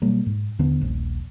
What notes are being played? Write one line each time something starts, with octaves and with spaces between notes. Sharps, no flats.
B2 F#3 G3 A#3
G#2
D#2 D3 B3
D#1 A#1